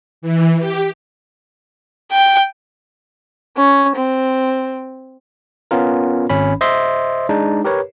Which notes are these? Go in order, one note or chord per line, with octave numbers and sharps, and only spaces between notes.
E3
G4
G5
C#4
C4
B3 C#4 F4 A#4
G#1 C#4 B5
C5 D#5 E5 C6
G#3 D4 D#4
G4 A#4 B4 C#5